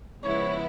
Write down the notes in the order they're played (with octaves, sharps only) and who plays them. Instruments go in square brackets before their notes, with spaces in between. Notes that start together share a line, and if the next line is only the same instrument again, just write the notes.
[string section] C#3 F3 G#3 B3 E4 [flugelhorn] C#5